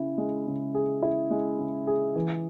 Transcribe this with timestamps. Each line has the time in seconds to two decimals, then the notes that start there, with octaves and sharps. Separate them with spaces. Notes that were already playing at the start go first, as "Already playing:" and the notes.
Already playing: C#3 E4
0.18 G#3
0.47 C#3
0.75 G#4
1.03 E4
1.31 G#3
1.59 C#3
1.87 G#4
2.16 E3